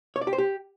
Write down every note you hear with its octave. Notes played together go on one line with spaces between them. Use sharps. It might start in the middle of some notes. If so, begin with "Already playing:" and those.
C#5
D5
G4
C5
G4